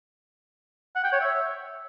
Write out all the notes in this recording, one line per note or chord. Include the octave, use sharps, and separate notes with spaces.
F#5
G5
C#5
E5